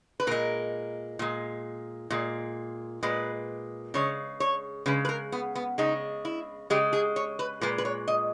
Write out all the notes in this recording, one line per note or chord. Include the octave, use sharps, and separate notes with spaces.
B4
A#2 G#3 A#4
A#2 G#3
A#2 G#3
A#2 G#3 B4
C#3 G#3 C#5
C#5
C#3 G#3 B4
B4
A#4
B3
B3
C#3 G#3 D#4
E4
C#3 G#3 G4
G#4
C#5
B4
A#2 G#3 B4
B4
C#5
D#5